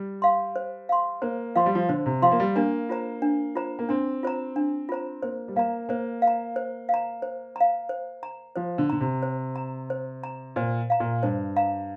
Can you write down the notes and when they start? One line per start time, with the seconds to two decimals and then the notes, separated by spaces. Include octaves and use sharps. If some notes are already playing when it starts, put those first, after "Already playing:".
Already playing: G3
0.22 F5 C6
0.56 C5
0.89 F5 C6
1.22 A#3 C5
1.56 F3 F5 C6
1.66 G3
1.75 F3
1.89 D3 C5
2.06 C3
2.22 F3 F5 C6
2.31 A#3
2.40 G3
2.56 A#3 D4
2.89 F4 C5 A#5
3.22 D4
3.55 F4 C5 A#5
3.79 A#3
3.89 C4 D4
4.23 F4 C5 A#5
4.56 D4
4.89 F4 C5 A#5
5.23 A#3 C5
5.48 G3
5.56 A#3 F5 A#5
5.89 A#3 C5
6.22 F5
6.27 A#5
6.56 C5
6.89 F5
6.94 A#5
7.22 C5
7.56 F5 A#5
7.89 C5
8.23 A#5
8.56 F3 C5
8.78 D3
8.90 D3 A#5
9.01 C3
9.23 C5
9.56 A#5
9.90 C5
10.24 A#5
10.56 A#2 C5
10.90 F5 A#5
11.00 A#2
11.23 G2 C5
11.56 F5 A#5